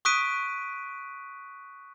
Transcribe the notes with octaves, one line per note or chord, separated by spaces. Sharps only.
C#6 D#6 F#6 B6 D7 D#7